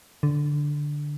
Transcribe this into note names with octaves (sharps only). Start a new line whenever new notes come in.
D3